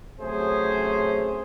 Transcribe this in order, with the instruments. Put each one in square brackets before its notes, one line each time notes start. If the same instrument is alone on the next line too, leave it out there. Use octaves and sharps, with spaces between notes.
[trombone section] C3 F#3 A3 C#4 G#4 C5